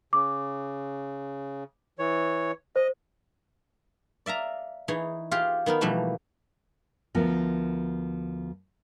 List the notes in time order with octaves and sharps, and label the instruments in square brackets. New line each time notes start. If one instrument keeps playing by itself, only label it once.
[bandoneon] C#3 [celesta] D6
[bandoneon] E3 C#5
[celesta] C5 [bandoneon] D#5
[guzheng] D5 E5 F5 A#5
E3 D#4 G#4 C#5
F4 G4 G#4 F5
D#3 B3 D#4 A#4
B2 E3 F3 G3 A3 A#3
[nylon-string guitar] D2 F3 B3 A#4